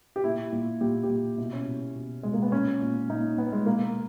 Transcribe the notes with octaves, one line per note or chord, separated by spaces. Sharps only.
G4
A#2 E4
A#2
A#2 G4
G4
A#2
B2 E4
C#4
B2
B2
B2 G#3
A#3
B3
A#2 C#4
A#2
A#2 D#4
A#2 B3
G#3
B2 A#3